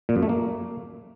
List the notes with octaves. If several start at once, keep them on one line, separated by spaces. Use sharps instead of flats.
A#2
F#2
A3
A#3